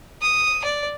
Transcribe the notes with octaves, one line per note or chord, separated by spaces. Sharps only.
D#6
D5